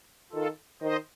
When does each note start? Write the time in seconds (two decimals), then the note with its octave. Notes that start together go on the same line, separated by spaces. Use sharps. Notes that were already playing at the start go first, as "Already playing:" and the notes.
0.32 D#3 F4 A4
0.81 D#3 C5 D#5